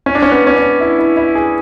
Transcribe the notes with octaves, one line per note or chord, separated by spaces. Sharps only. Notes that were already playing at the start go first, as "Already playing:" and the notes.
C#4
D4
C#4
B3
C#4
D4
E4
E4
E4
G#4